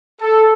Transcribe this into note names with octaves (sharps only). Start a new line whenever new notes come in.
A4